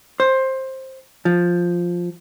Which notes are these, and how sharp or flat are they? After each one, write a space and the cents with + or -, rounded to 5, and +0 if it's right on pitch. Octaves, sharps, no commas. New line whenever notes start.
C5 +15
F3 +5